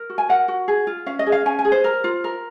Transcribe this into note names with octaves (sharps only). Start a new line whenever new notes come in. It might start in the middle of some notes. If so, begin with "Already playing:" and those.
Already playing: A#4
F#4
G#5
A#4 F#5
F#4
G#4
F4
C#4 F5
D#5
G#4
F5
C#4 G#5
G#5
G#4
C5
A#4
F4
A#4